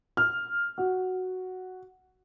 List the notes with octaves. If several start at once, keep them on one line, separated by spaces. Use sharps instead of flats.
F6
F#4